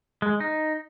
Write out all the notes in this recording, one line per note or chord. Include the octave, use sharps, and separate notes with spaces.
G#3
D#4